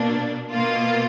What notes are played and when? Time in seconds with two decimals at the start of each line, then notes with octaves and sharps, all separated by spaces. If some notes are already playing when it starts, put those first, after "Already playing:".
Already playing: B2 A#3 D4
0.51 B2 A#3 F4